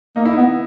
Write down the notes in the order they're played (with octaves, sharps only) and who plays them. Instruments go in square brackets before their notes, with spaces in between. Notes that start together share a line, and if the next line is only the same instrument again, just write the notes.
[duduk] A#3 [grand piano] D#4
[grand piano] E4
D#4
[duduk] B3